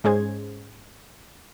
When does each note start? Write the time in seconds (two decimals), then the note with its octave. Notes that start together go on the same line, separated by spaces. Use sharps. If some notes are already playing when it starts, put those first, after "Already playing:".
0.04 G#2 G#3 C#4 G#4 C5 G#6